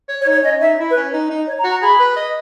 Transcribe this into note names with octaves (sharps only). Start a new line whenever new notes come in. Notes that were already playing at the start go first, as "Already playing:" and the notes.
C#5
C#5
D#4
C#5
C#4 D#5
D#4 E5
E4
B4
C#4
D#4
D#4
C#5
A#5
F#4
A#5
G#4 B5
B4
D#5